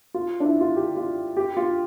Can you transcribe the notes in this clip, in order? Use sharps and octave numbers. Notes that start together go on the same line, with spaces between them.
F4
D4
E4
F4
G4
F4
G4
F4